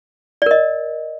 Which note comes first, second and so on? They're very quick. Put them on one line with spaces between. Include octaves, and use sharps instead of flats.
D5 A#4 D#5